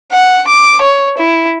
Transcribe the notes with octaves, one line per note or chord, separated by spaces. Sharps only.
F#5
D6
C#5
E4